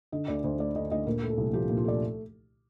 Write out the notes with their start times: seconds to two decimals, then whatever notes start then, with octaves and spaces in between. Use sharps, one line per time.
0.12 D3 D#5
0.28 D2 D5
0.44 D2 C5
0.59 A3 D5
0.75 D3 D#5
0.91 D2 D#5
1.07 A#2 A#4
1.22 A3
1.30 A4
1.38 C2
1.53 F3 G4
1.69 A#2
1.77 F4
1.85 A3 D5